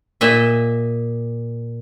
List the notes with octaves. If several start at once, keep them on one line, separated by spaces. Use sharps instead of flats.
A#2 D#5 E5